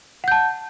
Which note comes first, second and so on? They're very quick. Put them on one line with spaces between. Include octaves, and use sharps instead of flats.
F#5 G6 A5